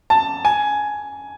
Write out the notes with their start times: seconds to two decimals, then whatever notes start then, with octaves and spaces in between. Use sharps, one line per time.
0.10 A5
0.45 G#5